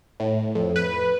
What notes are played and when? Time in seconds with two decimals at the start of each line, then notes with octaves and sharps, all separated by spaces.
0.20 A2
0.55 F2
0.76 B4